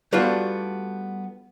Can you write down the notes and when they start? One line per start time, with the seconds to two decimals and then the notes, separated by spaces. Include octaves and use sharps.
0.12 G3 A3 B3 D4 F4 F#4